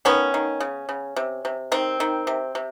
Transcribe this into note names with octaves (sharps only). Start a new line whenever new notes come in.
D#3 B3 C#4
D#3
C#3
C#3
C3
C3
D#3 C4
D#3
C3
C3